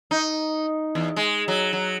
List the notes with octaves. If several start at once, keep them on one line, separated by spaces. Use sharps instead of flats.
D#4
E2
G#3
F#3
F#3